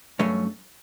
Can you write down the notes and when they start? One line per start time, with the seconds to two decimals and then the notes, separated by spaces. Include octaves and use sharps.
0.19 G2 F#3 A3 C#4